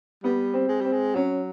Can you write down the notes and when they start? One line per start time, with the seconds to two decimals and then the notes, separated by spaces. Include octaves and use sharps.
0.23 G3 B3
0.54 C4
0.69 G#3
0.81 G3 C4
0.92 G#3
1.15 F#3 C#4